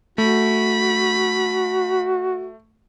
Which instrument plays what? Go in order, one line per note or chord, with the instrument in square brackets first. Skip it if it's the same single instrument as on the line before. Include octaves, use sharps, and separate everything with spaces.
[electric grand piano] A3 [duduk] F#4 [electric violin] B5